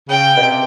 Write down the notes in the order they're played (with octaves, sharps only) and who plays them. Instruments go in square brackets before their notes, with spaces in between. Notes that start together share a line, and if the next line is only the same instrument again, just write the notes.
[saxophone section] C#3 [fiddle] G5
[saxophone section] B2
C3